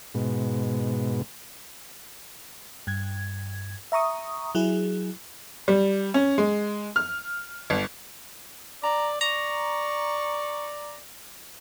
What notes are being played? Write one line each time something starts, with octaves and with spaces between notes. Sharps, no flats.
G#2 B2
G2 G#6
E5 A#5 C#6 D#6
F#3 E4 G#4
G3
C#4
G#3
F6
G1
D5 A#5
D5 A#5 C#6